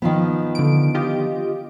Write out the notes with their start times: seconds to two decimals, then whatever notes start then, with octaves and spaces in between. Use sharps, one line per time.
0.02 D#3 F3 B3
0.55 D3 D7
0.95 F4 G4 D#5